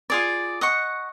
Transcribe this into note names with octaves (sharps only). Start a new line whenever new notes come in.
F4 G#4 D5
D#5 F#5 C#6